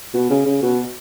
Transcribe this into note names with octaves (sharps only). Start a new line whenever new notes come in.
B2
C#3
C#3
B2